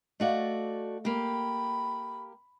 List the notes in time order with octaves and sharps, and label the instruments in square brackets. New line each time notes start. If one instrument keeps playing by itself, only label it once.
[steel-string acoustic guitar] A3 F#4 D5 [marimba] D#5 F5
[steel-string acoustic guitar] A#3 G4 [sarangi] B5